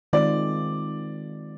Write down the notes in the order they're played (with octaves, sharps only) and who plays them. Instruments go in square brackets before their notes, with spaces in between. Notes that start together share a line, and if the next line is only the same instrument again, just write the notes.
[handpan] D#3 G#3 C4 F4 [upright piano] D5